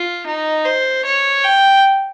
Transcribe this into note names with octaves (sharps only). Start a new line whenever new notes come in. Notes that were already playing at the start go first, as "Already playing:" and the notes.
Already playing: F4
D#4
C5
C#5
G5